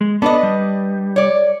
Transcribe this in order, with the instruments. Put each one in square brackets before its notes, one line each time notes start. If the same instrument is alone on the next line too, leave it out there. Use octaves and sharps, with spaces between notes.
[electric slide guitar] G#3
[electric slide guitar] B3 A4 [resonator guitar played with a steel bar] D4 B4 D#5
[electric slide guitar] G3
[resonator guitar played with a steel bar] C#5 D5